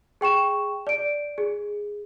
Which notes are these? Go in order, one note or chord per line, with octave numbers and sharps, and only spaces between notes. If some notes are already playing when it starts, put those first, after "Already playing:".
G#4 G5 C#6 E7
D5 D7
G#4